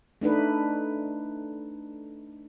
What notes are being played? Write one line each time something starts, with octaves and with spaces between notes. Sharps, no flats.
A3 D4 D#4 B4